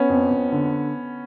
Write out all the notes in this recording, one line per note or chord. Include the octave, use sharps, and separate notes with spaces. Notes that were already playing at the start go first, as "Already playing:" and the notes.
Already playing: B3 C#4
F2
F2
D3